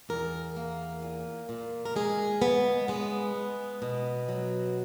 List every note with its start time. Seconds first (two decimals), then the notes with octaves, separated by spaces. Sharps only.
0.09 E2 A#4
0.57 A#3
1.02 A#2
1.49 A#2
1.85 A#4
1.96 G#3 G#4
2.42 C#3 B3
2.88 G#3 B3
3.35 G#3
3.82 B2
4.29 F#3